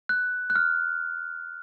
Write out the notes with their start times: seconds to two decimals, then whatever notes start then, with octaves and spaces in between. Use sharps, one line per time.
0.09 F#6
0.50 F#6
0.56 F6